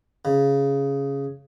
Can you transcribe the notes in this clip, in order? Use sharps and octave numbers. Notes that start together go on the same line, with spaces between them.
C#3